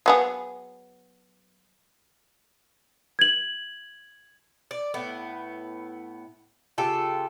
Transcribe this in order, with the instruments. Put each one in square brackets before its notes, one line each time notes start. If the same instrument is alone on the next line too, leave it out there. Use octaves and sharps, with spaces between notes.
[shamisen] F#3 B3 G#4
[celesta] G#6 F#7
[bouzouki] D5
A2 B3 E4
C#3 F4 G4 A4